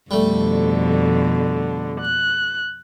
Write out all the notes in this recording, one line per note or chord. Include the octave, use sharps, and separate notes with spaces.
F2 B2 D3 G3 A3
F#6